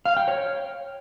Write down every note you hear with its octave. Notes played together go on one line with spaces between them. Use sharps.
F5
G5
C#5